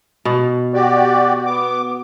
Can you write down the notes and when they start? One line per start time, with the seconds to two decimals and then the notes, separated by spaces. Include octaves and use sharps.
0.25 B2
0.74 F#4 G4 D5
1.46 B3 D6